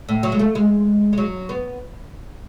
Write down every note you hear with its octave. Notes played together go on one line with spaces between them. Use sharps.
A2
F#3
G#3
A3
G#3
G#3
F#3
B3